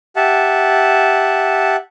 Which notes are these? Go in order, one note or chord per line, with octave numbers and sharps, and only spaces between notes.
G4 E5 F#5 A5